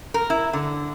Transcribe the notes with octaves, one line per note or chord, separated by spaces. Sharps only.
A#4
E4
D3